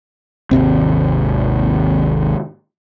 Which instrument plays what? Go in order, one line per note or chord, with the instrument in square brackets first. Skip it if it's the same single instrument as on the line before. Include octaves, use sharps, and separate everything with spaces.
[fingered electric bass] G#1 D#2 C3 C4